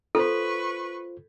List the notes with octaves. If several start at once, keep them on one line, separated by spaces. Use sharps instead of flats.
F4 A4 B4 C5 C#6